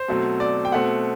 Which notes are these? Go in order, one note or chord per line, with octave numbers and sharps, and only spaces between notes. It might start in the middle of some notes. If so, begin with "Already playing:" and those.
Already playing: C5
B2 F#3 A3 C4
D5
G5
B2 A3 C4 F#5